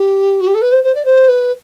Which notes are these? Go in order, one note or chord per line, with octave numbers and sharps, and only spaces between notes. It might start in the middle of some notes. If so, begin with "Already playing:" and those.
Already playing: G4
F#4
G4
A4
B4
C5
C5
D5
C5
B4